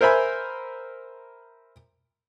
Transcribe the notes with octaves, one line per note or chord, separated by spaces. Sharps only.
A#4 C5 E5 G#5 B5